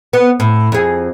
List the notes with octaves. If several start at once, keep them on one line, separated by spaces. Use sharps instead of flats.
B3
A2
F2 G#4